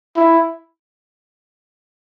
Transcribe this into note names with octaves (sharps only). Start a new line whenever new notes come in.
E4